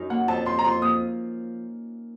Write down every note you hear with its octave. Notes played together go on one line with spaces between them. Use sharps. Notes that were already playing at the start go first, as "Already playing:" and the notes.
Already playing: F#2 D#4
A#3 F#5
F2 A5
F3 C6
A#5
F3 C6
A#3 D#6